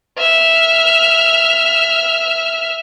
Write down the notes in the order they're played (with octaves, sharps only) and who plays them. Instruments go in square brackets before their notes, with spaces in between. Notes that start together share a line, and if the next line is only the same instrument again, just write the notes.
[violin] E5 F6